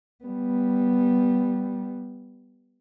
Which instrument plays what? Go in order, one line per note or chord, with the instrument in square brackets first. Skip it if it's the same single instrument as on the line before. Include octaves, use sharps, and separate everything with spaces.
[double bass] G3 B3